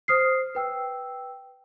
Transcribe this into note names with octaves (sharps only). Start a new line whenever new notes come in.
C5 D#6 F6 C7
B4 G5 E6